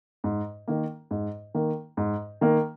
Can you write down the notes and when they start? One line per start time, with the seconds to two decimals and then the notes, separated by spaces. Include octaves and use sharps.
0.24 G#2
0.67 D#3 A#3
1.11 G#2
1.55 D#3 A#3
1.97 G#2
2.41 D#3 A#3